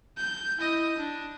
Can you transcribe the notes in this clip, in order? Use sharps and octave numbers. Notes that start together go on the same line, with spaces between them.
G6
E4 D#5
D4